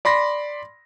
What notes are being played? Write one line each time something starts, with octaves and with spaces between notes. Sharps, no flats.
D5 B5 C6 A#6